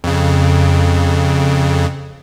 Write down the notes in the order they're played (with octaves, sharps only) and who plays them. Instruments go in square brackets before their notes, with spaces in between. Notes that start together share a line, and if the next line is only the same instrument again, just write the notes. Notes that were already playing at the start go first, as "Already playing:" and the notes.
[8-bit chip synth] F2 C#3